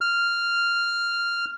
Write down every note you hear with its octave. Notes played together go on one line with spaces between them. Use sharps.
F6